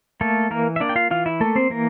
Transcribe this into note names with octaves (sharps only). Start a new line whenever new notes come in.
A3 A#3 A4
E3 A#3 A#4
E5
A#3 D4 D5
G5
F4 F5
E3 F4 F5
E4 E5
A3 A#3 A4
C4 C5
E3 A#3 A#4